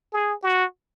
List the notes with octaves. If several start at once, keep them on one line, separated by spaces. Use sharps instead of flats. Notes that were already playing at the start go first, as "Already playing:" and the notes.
G#4
F#4